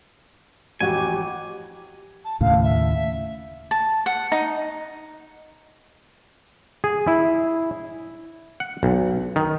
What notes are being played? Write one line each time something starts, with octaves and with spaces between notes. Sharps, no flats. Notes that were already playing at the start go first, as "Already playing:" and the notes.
A1 F2 F#4 G4 G#5
A5
D#2 A2 C#3 F5
E5
A5
F#5
D#4
G#4
E4
F#5
B1
D#3